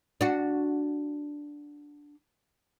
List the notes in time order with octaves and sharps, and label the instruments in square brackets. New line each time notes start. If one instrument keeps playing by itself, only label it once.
[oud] D4 F#4